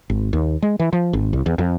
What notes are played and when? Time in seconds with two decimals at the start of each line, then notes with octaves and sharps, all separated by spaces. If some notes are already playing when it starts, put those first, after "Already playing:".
0.10 G#1
0.33 D#2
0.62 G#3
0.80 E3
0.93 F3
1.13 G#1
1.33 C2
1.46 E2
1.58 F2